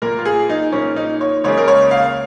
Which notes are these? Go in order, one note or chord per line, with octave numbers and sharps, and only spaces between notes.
A#2 A#3 A#4
F4
G#4
D#4
A#2 A#3 C#4
D#4
C#5
C#2 C#3 A#3 C#5
A#4
C#5
F5